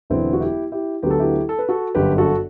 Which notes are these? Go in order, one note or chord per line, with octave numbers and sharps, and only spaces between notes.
E1 E2 D3 F#3 B3 C4 E4
F#4
E4 G4
E4 G4
D2 D3 F#3 B3 G4
A4
E4 G4
A4
B4
F#4 A4
G1 F#2 D3 G4 B4
F#4 A4